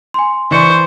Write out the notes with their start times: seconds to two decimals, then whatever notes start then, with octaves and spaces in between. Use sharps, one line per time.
0.14 G#5 C6
0.51 E3 C5 D5 C#6 C#7